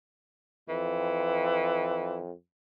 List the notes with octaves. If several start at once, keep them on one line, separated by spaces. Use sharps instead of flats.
F2 E3